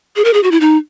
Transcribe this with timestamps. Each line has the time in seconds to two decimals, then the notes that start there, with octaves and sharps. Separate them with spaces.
0.16 G#4
0.25 A#4
0.34 G#4
0.43 F#4
0.51 E4
0.61 D#4